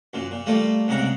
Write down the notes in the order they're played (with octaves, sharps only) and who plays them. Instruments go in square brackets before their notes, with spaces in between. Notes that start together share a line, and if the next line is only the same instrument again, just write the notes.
[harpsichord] F#2 A#2
A#2
G3 A3 A#3 F4
C2 G#2 C#3 A#4 F#5